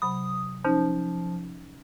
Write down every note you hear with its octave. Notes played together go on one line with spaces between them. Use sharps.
C3 F#3 B5 D#6
F3 C#4 D#4